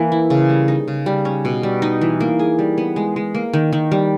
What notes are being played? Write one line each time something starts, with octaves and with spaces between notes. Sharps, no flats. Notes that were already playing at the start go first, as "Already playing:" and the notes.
Already playing: E3 A#3
E4
C#3
G3
D#4
C#3
G3
C#4
B2
G3
D#4
E3
A#3
G#4
G3
B3
G#3
G#3
A#3
D#3
D#3
G3